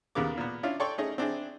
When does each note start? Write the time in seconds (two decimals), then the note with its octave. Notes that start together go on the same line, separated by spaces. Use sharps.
0.15 D#2 C#3 B3 A#4 D6
0.37 A#2 B3
0.63 C#4 D4 E4 F4 F5
0.80 A4 C#5 D5 G5 C6 C#6
0.98 A3 C#4 D#4 G#4 D#5
1.18 C4 D4 E4 G#4